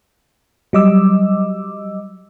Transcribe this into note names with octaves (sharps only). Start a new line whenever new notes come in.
F#3 G3 D#5 D6 E6